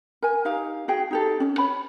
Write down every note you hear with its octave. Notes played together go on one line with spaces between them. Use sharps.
A#4 G#5
D#4 G4 F5
F#4 G#4 G5
D#4 G4 A4
C#4
C#5 B5